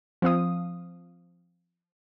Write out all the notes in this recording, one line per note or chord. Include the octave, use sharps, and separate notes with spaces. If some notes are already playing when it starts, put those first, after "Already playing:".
F3 C4 F5 D#6